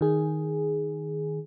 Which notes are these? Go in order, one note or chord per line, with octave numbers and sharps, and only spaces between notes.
D#3 G#4